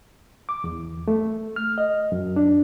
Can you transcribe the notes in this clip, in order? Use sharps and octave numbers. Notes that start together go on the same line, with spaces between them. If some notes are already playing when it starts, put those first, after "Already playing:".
D6
E2
A3
F6
D#5
F#2
D4